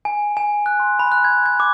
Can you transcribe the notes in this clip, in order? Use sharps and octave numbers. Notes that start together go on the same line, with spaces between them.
G#5
G#5
F#6
C6
B5
F#6
G#6
G#6
D6